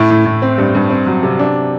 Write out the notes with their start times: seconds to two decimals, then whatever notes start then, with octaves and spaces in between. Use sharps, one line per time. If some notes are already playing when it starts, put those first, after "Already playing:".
Already playing: A2 E4
0.10 A2
0.25 A2
0.42 C4
0.58 G2
0.75 G2
0.90 C4
1.07 F#3
1.23 C3
1.39 D4